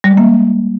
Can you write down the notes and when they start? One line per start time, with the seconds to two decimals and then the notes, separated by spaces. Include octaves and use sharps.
0.04 G3
0.11 G#3
0.17 A#3